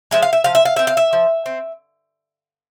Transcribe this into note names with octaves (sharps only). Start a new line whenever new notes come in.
F3 G#3 E5
F5
E5
F3 F5
E5
F5
C4 E5
F5
E5
F3
C4